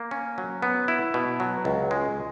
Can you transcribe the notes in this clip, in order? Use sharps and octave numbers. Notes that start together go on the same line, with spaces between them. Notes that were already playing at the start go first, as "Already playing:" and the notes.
Already playing: A#3
C#4
F#3
B3
E4
B2
F#3
C#2
G#3